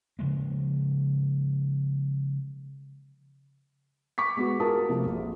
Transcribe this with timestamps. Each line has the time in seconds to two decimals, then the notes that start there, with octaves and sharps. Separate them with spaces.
0.19 C#3 F3 G#3 A#3
4.18 C#6 D6 B6
4.37 G#3 B3 F#4
4.60 F4 F#4 G#4 A#4 A5 D#6
4.88 C3 F3 A3
5.06 A#1